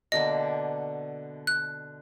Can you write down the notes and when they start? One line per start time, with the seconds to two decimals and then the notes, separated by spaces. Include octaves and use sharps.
0.12 B2 D3 A#3 D#5
1.47 F#6